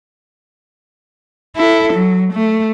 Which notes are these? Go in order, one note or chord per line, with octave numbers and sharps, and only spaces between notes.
E4 A4
F#3
A3